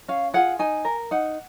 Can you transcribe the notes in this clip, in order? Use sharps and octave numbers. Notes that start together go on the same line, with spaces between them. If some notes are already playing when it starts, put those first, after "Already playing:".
C#4 F5
F4 G#4 F#5
D#4 G#5
A#4
D#4 F#5